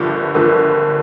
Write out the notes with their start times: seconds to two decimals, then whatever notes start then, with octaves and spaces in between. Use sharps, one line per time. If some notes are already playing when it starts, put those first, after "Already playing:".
Already playing: G1 G2 D3 F3 A#4
0.34 G1 G2 D3 F3 A#4